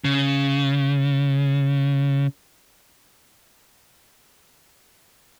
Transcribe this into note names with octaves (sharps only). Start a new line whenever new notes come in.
C#3